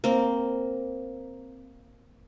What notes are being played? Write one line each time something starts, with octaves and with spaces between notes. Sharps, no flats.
A#3 C4